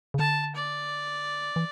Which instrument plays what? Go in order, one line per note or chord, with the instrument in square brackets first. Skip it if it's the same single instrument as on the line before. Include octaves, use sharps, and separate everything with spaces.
[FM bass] C#3
[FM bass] D3 [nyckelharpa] A5
[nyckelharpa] D5
[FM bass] E3